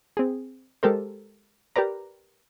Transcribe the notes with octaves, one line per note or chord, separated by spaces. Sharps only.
C4 G#4
G#3 G4 A4 A#4 C5
G4 A#4 B4 D5 A#5